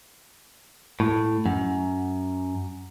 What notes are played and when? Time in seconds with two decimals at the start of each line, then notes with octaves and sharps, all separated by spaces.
1.00 A2
1.46 F#2